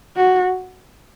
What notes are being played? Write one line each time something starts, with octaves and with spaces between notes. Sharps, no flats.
F#4